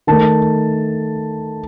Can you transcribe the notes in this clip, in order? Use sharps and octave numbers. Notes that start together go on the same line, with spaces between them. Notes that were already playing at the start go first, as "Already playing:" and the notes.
D#3 A3 A5